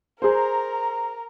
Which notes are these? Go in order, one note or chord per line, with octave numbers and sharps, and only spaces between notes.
G#4 A#4 C5 A#5